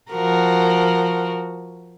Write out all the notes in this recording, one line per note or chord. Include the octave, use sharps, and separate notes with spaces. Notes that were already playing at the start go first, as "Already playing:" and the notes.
F3 F#4 A#4